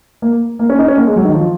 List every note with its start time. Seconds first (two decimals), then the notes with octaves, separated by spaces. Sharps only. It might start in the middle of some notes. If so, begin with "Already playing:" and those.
0.22 A#3
0.59 A#3
0.69 C#4
0.79 D#4
0.88 C#4
0.97 A#3
1.07 G#3
1.16 F#3
1.25 D#3
1.34 F3